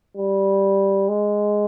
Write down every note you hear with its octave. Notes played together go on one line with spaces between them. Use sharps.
G3
G#3